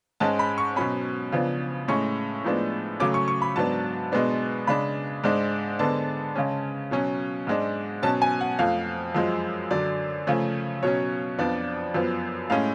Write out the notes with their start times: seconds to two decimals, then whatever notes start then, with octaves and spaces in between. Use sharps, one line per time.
0.20 G#2 G#3 C#4 A5
0.39 B5
0.58 C#6
0.76 B2 F#3 C#4 B5
1.32 C#3 F3 B3 D4
1.88 A2 G#3 C#4 C#6
2.44 A2 F3 G#3 B3 D4
3.00 C#3 F#3 A3 C#4 D6
3.14 C#6
3.28 C#6
3.42 B5
3.56 G#2 F#3 B3 D4 A5
4.12 B2 G#3 B3 D4
4.67 C#3 G#3 D4 B5
5.24 G#2 G#3 D4
5.79 D3 G#3 B3 D4 A5
6.35 C#3 G#3 C#4
6.91 B2 F#3 C#4
7.47 G#2 G#3 D4
8.02 B2 F#3 C#4 A5
8.22 G#5
8.41 F#5
8.59 F2 F3 A3 F5
9.15 F#2 F3 G#3
9.71 F#2 D3 F#3 D5
10.27 C#3 F3 A3 C#4
10.83 B2 F#3 C#4 C#5
11.38 F2 F3 B3 D4 D5
11.94 F#2 F3 B3
12.50 A2 G#3 C#4 F5